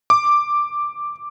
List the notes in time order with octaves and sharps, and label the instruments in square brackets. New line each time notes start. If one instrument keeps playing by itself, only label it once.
[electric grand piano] D6